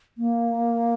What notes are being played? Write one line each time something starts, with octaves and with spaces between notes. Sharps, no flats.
A#3